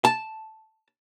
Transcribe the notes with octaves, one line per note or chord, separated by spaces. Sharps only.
A5